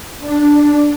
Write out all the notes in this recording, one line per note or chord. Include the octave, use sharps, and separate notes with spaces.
D4